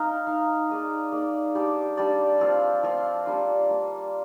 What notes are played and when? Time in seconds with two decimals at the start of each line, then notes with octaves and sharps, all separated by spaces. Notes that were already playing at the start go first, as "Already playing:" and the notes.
Already playing: D#4 A#4 F5
0.27 D#4 A#4 F5
0.69 A#3 D#4 G#4 D5
1.12 A#3 D#4 G#4 D5
1.55 G3 D4 G4 D5
1.97 G3 D4 G4 D5
2.40 F3 C4 F4
2.83 F3 C4 F4
3.26 G3 A#3 D4 F4
3.68 G3 A#3 D4 F4